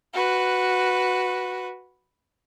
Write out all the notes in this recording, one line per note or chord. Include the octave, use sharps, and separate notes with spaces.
F#4 B4